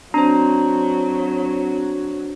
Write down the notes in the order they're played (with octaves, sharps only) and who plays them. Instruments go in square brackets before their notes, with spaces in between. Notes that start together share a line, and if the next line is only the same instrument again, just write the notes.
[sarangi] F#3 [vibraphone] C4 [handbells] D4 C5 [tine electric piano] A#5